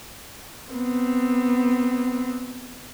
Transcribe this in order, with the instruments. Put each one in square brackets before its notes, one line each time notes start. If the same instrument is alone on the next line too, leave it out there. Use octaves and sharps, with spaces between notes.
[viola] B3 C4